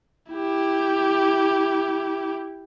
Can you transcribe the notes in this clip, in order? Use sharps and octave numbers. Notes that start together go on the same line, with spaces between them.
E4 G4